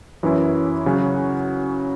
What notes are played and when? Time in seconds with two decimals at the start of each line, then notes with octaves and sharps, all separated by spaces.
0.23 F#2 E3 C#4 E4
0.86 C#3 F#3 C#4 F#4